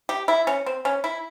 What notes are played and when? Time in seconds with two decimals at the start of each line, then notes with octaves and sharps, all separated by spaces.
0.09 G4
0.28 E4
0.47 C#4
0.66 C4
0.85 C#4
1.04 E4